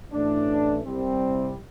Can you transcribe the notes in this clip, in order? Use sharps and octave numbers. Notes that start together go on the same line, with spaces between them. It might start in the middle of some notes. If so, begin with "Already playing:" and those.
A1 A2 E3 A3 D4
C2 C3 G3 C4